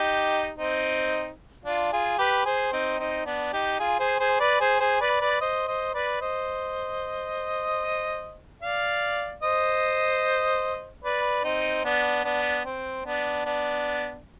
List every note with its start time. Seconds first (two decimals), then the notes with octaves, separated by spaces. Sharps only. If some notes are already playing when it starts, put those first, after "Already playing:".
Already playing: D#4 G4
0.58 C4 D#4
1.65 D4 F4
1.92 F4 G#4
2.18 G4 B4
2.45 G#4 C5
2.72 C4 D#4
2.99 C4 D#4
3.26 B3 D4
3.53 D#4 G4
3.79 F4 G#4
3.99 G#4 C5
4.19 G#4 C5
4.40 B4 D5
4.60 G#4 C5
4.80 G#4 C5
5.01 B4 D5
5.21 B4 D5
5.41 C5 D#5
5.68 C5 D#5
5.94 B4 D5
6.21 C5 D#5
8.62 D5 F5
9.43 C5 D#5
11.04 B4 D5
11.44 C4 D#4
11.84 B3 D4
12.24 B3 D4
12.65 C4
13.05 B3 D4
13.45 B3 D4